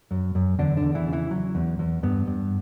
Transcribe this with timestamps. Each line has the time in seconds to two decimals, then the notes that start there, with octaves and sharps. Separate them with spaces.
0.11 F#2
0.35 F#2
0.59 E2 D3 D4
0.77 D3 D4
0.83 E2
0.95 E3 E4
1.07 C#3
1.13 E3 E4
1.31 F#3
1.55 E2
1.79 E2
2.03 G2 B3
2.27 G2